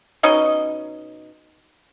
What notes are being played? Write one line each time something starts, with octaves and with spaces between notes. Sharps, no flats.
B2 C#4 D#4 D#5